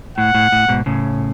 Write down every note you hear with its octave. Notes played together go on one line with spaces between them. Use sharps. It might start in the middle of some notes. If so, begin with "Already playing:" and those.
A2 F#5
A2
A2
G#2 B2
A2 C#3